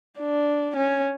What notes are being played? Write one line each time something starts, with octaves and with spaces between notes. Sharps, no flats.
D4
C#4